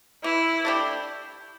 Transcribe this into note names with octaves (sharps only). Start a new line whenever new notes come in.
E3 E4
A3 D4 G4